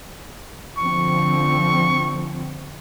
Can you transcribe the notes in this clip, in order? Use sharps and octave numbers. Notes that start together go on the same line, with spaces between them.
D3 F3 C4 C#6